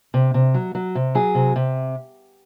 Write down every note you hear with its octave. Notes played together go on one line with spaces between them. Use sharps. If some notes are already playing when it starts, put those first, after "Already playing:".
C3
C3
F#3
F#3
C3
F#3 G#4
C3
C3